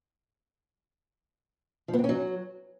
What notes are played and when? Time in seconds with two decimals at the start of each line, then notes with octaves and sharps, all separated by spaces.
1.88 F3
1.93 B3
1.99 C4
2.04 C#4
2.09 F#3